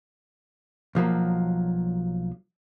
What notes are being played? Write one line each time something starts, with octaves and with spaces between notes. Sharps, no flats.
B1 F3 F#3 A#3